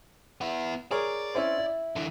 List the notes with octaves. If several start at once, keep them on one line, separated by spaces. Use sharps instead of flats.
B3 E4
G#4 A#4 C#5 D5
C4 C#4 E4
E4
D3 E3